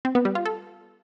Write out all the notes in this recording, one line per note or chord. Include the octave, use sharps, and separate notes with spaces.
C4
B3
G3
F4
A4